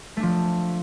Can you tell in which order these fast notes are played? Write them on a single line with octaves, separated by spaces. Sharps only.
A3 D4 F3